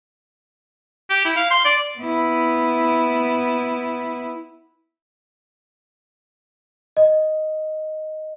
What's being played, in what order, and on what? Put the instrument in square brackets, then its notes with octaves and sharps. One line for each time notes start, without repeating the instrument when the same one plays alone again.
[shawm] G4
E4
F5
C6
D5
[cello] B3 E4
[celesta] D#5